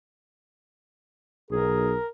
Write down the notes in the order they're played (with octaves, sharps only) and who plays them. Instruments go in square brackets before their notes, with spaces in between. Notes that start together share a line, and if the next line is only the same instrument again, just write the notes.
[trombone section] B1 [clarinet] G#4 [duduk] A#4